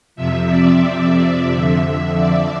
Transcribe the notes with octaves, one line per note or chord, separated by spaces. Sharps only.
F2 C3 F3 E5
D5
E5
F2 D3 F3
D5